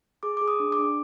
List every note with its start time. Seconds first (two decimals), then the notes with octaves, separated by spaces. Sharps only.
0.23 G#4 D6
0.37 G#4 D6
0.48 D#6
0.60 D4
0.72 D6
0.79 D4